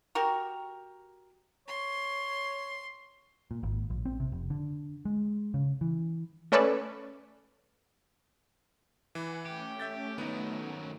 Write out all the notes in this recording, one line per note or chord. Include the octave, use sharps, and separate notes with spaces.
F#4 G4 A#4
C#5 C6
A#2
G#1
A#1
C4
C3
F1
D3
G#3
C#3
E3
A3 C#4 A4 B4 D5
E3 F#5 G#5 F#6
A3 C#4 G4
E5 G6 A6
D#3 F#3 B3 D#4